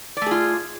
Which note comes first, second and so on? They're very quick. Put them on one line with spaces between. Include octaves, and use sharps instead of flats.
D5 A3 G#4 F4